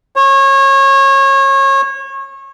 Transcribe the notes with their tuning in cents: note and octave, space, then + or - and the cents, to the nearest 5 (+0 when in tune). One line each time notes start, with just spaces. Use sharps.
C#5 -30